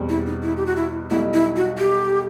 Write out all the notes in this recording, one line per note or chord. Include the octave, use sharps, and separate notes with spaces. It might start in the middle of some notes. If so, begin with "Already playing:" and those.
Already playing: E2 B2 G3 C4
E4
D#4
E4
G4
F#4
E4
B1 B2 G3 D#4 E4
E4
F#4
G4